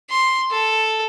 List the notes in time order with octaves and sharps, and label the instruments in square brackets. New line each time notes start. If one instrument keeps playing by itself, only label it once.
[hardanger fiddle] C6
A4